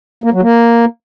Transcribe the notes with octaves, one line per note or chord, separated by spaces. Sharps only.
A#3
F#3
A#3